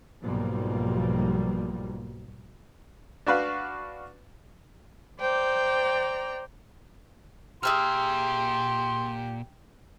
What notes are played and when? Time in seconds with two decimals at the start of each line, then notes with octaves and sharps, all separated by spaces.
0.23 B1 G#2 B2 F3 G3 A#3
3.26 D4 F#4 B4 F5
5.18 C5 D5 G5 A#5
7.63 A#2 G4 G#4 E5 C6 F6